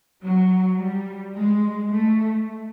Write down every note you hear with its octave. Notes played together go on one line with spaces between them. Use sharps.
F#3
G3
G#3
A3